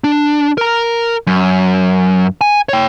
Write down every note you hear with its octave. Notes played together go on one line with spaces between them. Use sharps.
D4
A#4 A#5
F#2
G#5
C#5 G5